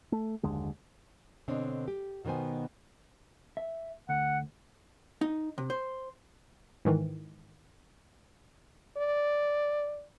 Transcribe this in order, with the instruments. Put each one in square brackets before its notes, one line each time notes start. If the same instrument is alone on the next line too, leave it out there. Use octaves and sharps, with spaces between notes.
[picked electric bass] A3
F#1 D#2 D3 G#3
[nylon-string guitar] B2 D3 C4 D4 C#5 D#5
G4
B2 D#3 B3 C5 G#5
[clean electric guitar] E5
[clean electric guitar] D2 [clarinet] F#5
[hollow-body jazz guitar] D#4
C3
C5
[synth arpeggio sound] G#2 D#3 E3
[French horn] D5